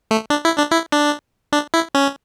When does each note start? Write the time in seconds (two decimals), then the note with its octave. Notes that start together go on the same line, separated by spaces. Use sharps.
0.11 A3
0.30 D4
0.45 E4
0.58 D4
0.72 E4
0.92 D4
1.53 D4
1.74 E4
1.95 C#4